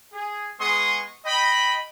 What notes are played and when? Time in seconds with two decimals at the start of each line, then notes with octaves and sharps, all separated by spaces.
0.13 G#4
0.59 G#3 B3 G#4 C6 C#6 D#6
1.24 D#5 G5 B5